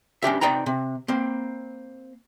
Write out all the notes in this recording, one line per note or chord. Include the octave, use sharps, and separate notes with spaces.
C#4 D4 G4 E5
C3 C4 D#4 D5 G5 A#5
C3
A#3 C4